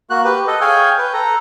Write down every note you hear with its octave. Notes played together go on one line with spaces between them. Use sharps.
A#3 F#4 F#6
G4 B4
A4 D#5
G#4 C#5 F5 G5 G#5
B4 G5
A4 A#5